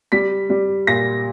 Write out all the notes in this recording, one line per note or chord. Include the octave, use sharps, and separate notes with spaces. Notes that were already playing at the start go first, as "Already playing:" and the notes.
G3 B6
G3
A#2 A#6